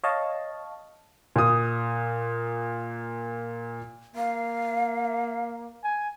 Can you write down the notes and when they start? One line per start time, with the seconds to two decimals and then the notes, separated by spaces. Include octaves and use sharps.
0.04 C#5 D#5 F5 A5
1.36 A#2 D#6
4.16 A#3 F5
5.84 G#5